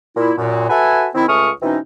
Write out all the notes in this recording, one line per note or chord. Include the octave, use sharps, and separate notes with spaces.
A#2 E4
F#2 A#2
F#4 A4 B4 E5 G#5
D#3 C4 E4
C#2 A3 C#4 C#6 D#6 F6
B2 E3 C4 C#4 D#4